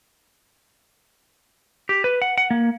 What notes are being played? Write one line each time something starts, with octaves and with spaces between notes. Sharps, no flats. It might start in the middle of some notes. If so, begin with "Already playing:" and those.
G4
B4
F#5
F#5
A#3